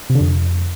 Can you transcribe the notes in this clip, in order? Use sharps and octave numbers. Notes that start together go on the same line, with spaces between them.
C3
D3
F2